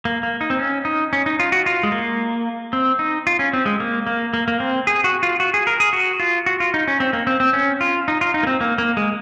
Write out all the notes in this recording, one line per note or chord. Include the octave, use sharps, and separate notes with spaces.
A#3
A#3
D#4
C4
C#4
D#4
C#4
D#4
F4
F#4
F4
G#3
A#3
C4
D#4
F4
C#4
C4
G#3
A#3
A#3
A#3
A#3
C4
G#4
F#4
F4
F#4
G#4
A#4
G#4
F#4
F4
F#4
F4
D#4
C#4
C4
A#3
C4
C4
C#4
F4
D#4
F4
D#4
A#3
C4
A#3
A#3
G#3